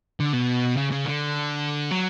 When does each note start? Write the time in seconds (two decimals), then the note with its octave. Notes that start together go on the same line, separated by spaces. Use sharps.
0.20 D3
0.33 B2
0.76 C#3
0.92 C#3
1.05 D3
1.91 F#3